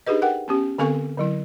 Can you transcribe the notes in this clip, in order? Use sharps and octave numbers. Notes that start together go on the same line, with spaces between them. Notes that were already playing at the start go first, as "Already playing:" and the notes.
D4 D#4 G4 G#4 B4 D#5
A#4 F#5 G5
B3 C#4 G4
D3 B3 C4 A4 F5 C#6
D3 F#3 E4